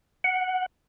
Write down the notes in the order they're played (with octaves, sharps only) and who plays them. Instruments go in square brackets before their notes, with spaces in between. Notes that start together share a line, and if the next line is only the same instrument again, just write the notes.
[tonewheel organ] F#5